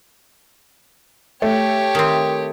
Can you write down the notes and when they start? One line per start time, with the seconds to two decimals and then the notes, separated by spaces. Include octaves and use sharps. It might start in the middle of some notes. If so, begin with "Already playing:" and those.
1.42 A3 G4 C#5
1.95 D#3 C4